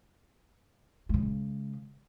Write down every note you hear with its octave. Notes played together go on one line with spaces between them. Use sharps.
C#3 G#3